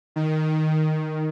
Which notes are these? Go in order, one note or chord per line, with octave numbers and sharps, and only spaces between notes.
D#3